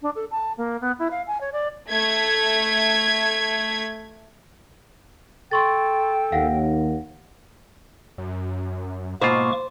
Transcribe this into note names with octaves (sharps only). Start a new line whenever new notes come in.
D4
A4
A5
A#3
B3
E4
F5
G#5
C#5
D5
A3 G#6 B6
A4 G5 C6 C#6 A6
D#2 F5 F#5 A#6
F#2
G#2 B2 A#3 F4 C5 C#6 D6